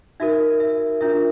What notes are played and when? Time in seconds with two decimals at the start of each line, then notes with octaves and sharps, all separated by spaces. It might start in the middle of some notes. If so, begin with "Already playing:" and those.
0.20 D#4 F#4 A#4 E5
0.60 E5
1.01 D4 F4 A#4 E5